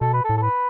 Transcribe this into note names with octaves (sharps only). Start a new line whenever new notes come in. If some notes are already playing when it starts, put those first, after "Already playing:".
B2 A4
B4
A4
A2
A4
B4